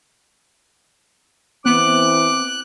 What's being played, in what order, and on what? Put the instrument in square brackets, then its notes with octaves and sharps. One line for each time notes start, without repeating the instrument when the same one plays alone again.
[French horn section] E3 C4 [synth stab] B3 [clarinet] D6 [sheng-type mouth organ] F#6